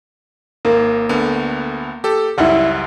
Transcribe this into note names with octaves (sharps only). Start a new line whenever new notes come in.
G#1 A#3
D2 D3 B3
G4 A4
C#2 F#2 G3 E4 F#5